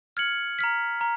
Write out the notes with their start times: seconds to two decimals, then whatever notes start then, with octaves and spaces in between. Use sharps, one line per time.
0.17 F6 G#6 C#7 F#7
0.59 A#5 F6 B6
1.01 A#5